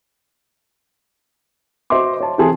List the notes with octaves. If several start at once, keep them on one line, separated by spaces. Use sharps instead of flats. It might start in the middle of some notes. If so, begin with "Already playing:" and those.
F#4 C5 D#5 E5 C6 D6
C#5 A5
C3 E3 C4 G#4 A5 C6